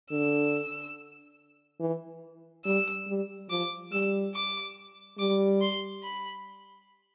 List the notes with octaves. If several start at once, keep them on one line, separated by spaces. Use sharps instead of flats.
D3 E6
E3
G3 E6
G3
F3 D6
G3 E6
D6
G3 D6
C6
B5